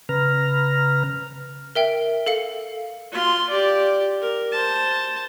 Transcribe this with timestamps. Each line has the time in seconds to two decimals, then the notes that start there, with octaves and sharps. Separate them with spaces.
0.09 C#3 B4 A#5 F6
1.75 A#4 E5 G5
2.26 A4 F5 C#7
3.12 F4 C6
3.49 G4 D5
4.22 A#4
4.52 C5 A5